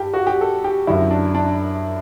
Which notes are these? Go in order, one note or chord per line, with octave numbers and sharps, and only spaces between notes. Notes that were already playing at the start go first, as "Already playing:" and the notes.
Already playing: G2 G4
F#4
G4
A4
G4
F#2 D3 F#3 E4
D4
D4